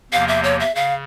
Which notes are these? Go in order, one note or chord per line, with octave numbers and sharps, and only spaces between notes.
E2 C3 F3 A#3 F5
E5
C#5
E5
C#3 F5